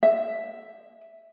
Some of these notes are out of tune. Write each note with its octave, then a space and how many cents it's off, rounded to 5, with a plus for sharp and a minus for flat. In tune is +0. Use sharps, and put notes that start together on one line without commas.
E5 +5